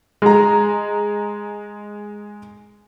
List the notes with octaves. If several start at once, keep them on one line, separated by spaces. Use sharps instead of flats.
G#3 A#5